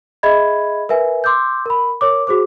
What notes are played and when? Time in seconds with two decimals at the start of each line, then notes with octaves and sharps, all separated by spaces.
0.23 G#4 D#5 E5 B5 G#6
0.89 A#4 B4 E5 G#5
1.24 C6 D6 E6 G6
1.66 A#4 B5
2.01 A#4 C#5 D6
2.27 F#4 G#4 C5 D6